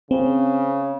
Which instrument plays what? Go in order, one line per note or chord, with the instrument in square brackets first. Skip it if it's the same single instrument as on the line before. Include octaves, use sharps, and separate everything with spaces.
[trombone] C#3 [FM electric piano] C4